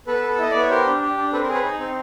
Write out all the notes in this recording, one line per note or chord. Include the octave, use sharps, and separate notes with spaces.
B3 A4 B4
A4
E4 D#5
B3 D5
C#5
G4 A#4 C5
D4
G4
D4
C4 A4 B4
A#4 C5
G#4
B4 C#5
D#4
C4